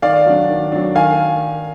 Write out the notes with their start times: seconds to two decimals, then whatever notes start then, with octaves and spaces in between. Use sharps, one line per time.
0.02 D#3 D5 F5
0.26 F#3 D4
0.48 D#3
0.72 F#3 D4
0.95 D#3 F5 G#5